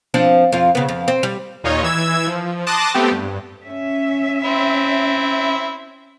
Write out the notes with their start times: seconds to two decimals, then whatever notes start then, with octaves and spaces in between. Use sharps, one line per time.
0.14 F3 C4 D4
0.52 F2 F4
0.75 C#3 B3
0.89 F2
1.08 C4
1.23 G3
1.64 D#2 A#2 D#4 F4 C#5 D#5
1.83 E3 E6 G#6
2.27 F3
2.67 A5 C6 D6 D#6 F#6 A#6
2.94 A3 B3 C4 G4
3.11 G2
3.64 C#4 E5
4.44 C4 E4